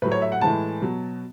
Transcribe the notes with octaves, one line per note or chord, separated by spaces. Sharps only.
A2 F#3 B4
C#5
E5
F#5
A2 E3 G#3 A5
B2 F#3